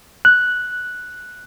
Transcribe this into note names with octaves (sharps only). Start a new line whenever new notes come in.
F#6